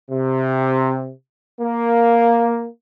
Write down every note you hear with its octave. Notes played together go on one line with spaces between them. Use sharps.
C3
A#3